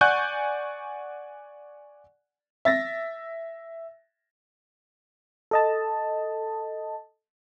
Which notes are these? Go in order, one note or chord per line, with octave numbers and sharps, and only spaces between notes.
D5 F#5 G#5 C#6 F#6 G6
E5 A6 A#6
A4 D#5 A5